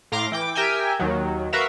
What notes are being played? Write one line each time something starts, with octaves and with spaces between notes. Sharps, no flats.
A2 F5 A#5 C6 D6 A#6
E3 G5 D6
G4 A#4 E5 G5 G#5
D#2 D#3 F#3
F#4 A#4 B4 E5 F5